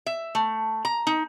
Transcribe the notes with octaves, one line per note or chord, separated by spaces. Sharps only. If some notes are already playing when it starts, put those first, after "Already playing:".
E5
A3
A#5
D#4